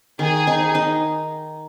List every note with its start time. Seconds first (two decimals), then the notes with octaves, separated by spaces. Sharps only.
0.19 D#3 G#4
0.47 D#4
0.75 D#4